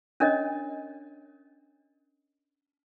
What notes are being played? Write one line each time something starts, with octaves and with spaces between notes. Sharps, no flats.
C#4 D4 A#4 C#5 D#5